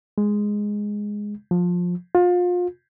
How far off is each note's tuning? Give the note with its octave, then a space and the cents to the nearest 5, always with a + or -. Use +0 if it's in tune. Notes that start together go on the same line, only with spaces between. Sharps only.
G#3 -5
F3 +20
F4 +30